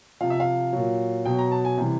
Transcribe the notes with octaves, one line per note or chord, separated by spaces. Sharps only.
C3 F3 F5
E5
F5
A#2 F#3
B2 F#3 G5
A#5
A5
G#5
C3 E3 G3